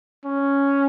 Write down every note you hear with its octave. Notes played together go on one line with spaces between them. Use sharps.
C#4